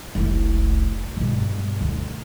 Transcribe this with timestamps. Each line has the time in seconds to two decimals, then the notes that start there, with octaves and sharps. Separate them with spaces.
0.15 F1 C2
1.17 G2 B2
1.81 D2